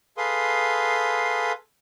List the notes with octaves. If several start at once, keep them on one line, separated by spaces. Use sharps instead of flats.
G#4 A4 B4 F5 C6 D#6